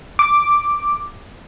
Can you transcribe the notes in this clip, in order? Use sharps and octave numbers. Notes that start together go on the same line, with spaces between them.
D6